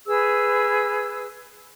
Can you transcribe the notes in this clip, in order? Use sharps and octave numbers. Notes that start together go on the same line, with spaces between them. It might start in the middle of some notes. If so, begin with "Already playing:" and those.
G#4 B4 E6